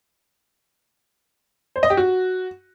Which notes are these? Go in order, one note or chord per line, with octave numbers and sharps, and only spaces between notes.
C5
D#5
G4
F#4